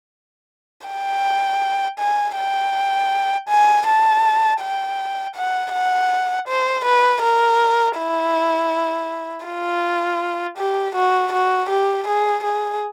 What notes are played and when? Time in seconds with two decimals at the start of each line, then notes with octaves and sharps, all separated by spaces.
0.87 G5
1.99 G#5
2.36 G5
3.49 G#5
3.87 A5
4.61 G5
5.35 F#5
5.72 F#5
6.48 C5
6.85 B4
7.22 A#4
7.97 E4
9.46 F4
10.58 G4
10.95 F#4
11.32 F#4
11.70 G4
12.08 G#4
12.44 G#4